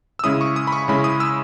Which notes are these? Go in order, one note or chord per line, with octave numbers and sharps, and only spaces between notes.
E6
C#3 G#3 C#4 E4 D#6
C#6
D#6
B5
C#6
C#3 G#3 C#4 E4 B5
D#6
E6